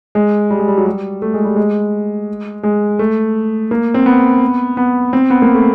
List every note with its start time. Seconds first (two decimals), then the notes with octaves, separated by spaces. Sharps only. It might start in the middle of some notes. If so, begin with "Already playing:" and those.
0.15 G#3
0.50 G3
0.59 G#3
0.68 G3
0.78 F#3
0.86 G3
1.22 A3
1.34 G#3
1.44 G3
1.56 G#3
2.63 G#3
2.99 A3
3.71 A#3
3.94 C4
4.06 B3
4.77 B3
5.13 C4
5.30 B3
5.42 A#3
5.55 A3